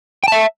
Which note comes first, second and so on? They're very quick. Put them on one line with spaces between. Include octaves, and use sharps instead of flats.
G5 A5 E5